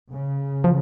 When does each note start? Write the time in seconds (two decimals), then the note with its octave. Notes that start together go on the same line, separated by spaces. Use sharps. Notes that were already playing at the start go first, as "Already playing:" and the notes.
0.11 C#3
0.64 F3